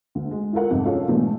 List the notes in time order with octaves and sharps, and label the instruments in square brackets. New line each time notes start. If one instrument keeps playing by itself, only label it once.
[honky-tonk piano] D2
G#3
E4 F4 A4 A#4 F#5
F2 G#2 C3 G3
C#4 F4 F#4 G#4 A4 F5
B2 E3 G#3 A3 D4